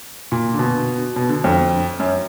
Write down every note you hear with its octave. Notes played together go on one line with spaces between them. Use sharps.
A#2
D3
B2
B2
D3
F2
F#2